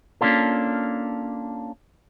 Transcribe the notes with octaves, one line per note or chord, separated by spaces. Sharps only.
A#3 C#4 D4 F4 A4